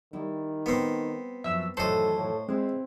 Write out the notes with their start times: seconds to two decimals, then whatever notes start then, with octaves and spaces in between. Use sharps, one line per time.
0.13 D#3 G3 E4
0.66 B3 C4
1.44 F#2 F3 E5 E6
1.77 F#2 A2 D#3 E3 A4 C5 D#5
2.17 A2
2.48 G#3 C4 E4 B4